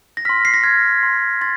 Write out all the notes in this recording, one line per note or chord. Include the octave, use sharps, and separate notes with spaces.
A#6
C6 F6 B6
C7
A#6
C6 F6 G#6
C6 F6
C6 A6